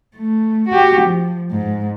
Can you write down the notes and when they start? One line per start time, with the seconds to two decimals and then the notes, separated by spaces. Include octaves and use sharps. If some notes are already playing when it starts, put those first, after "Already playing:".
0.17 A3
0.69 F#4 G4
1.01 F3
1.52 G#2